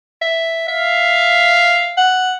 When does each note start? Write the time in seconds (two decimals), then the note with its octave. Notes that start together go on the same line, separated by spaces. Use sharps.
0.22 E5
0.68 E5 F5
1.98 F#5